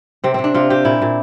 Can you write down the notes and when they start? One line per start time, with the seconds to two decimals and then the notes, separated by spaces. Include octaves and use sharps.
0.24 C3 C4
0.34 C3 C4
0.44 D4
0.54 C3 F4
0.70 C4 G4
0.85 A#2 E4
1.02 A#2